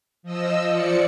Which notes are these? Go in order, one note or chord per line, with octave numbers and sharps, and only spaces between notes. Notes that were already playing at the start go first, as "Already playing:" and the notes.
F3 D#5 E6
F3 D5 C#7